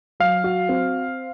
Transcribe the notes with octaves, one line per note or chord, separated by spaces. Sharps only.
F#3 F5
F#4
C4